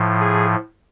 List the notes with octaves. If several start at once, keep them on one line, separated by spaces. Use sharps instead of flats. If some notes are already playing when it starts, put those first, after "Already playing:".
Already playing: A2 F3
G#4